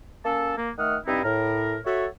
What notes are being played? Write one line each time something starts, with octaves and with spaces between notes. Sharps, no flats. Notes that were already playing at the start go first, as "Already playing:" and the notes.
A#3 C#4 A4
A#3
D#3 A3 F#5 D#6 F6
G2 C4 D#4 E4
A2 A#4
F#4 A4 C#5 E5